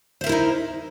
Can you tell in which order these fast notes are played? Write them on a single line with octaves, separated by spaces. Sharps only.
C5 E5 A#4 E4 D#4